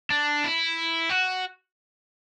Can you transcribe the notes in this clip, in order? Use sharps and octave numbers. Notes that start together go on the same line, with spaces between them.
D4
E4
F#4